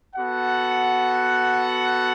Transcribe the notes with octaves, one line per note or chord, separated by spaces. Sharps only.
B3 F#4 A4 F#5